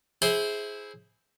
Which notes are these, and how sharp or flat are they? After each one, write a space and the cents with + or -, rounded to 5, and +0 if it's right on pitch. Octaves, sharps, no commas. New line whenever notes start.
E4 -10 G#4 +10 C5 +0